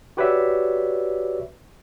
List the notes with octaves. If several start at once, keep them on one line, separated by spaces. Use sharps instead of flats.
F#4 G4 B4 C#5 D5 E5